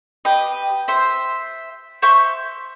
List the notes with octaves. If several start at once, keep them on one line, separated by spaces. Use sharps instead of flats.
G4 B4 D#5
C5 E5
C5 E5 C#6 G6